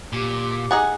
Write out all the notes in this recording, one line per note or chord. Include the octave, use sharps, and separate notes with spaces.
A#2 G4
D#4 G#4 F#5 G#5